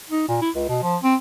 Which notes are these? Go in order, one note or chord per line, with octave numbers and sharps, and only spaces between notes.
D#4
A#2
E4
C#2
B2
F3
C4